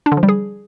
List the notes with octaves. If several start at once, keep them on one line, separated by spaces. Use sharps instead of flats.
D4
D3
F3
G3
G#4